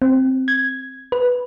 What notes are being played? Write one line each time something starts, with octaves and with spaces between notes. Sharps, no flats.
C4
G#6
B4